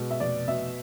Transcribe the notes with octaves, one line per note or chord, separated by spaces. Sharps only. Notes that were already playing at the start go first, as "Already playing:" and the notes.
Already playing: B2 G#3
E5
F1 D5
B2 E5